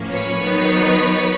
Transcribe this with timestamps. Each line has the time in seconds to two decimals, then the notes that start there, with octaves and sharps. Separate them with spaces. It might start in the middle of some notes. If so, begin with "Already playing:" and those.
Already playing: A2 F3 A#3 C#4
0.12 B4 C#5
0.41 D#3 F#3 B3 D#4